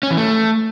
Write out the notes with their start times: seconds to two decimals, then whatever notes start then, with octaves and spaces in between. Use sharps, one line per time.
0.03 C#4
0.10 E3
0.17 A3